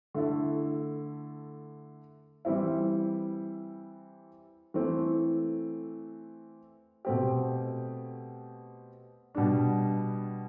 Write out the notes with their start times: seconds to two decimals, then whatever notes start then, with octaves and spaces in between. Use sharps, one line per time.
0.15 D3 A3 E4 A4
2.45 E3 G3 C4 E4
4.74 E3 A3 C4
7.05 B2 A3 C4 G4
9.35 B2 G3 D4